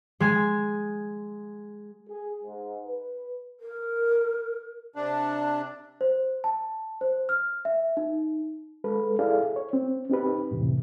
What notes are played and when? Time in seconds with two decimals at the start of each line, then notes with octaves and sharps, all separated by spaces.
0.20 G#3 G#5
2.08 G#4
2.43 G#2
2.85 B4
3.60 A#4
4.96 C3 D4
6.01 C5
6.44 A5
7.01 C5
7.29 F6
7.65 E5
7.97 D#4
8.84 G#3 A4 B4
9.19 E4 G#4 A4 D5 F5
9.56 C#5
9.73 C4
10.10 C4 D#4 G4 B4
10.51 F2 A2 C3 E3